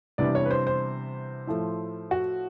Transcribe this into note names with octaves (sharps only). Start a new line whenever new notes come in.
C3 E3 G3 B3 D4 D5
C#5
B4
C5
C5
A2 F3 A3
F#4